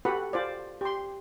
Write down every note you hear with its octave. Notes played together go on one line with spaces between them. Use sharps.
F#4 G4 A4 B4 F#5 B5
F4 C5 D5
G4 C6